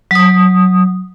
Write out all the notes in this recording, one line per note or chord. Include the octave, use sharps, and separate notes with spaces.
F#3 D#6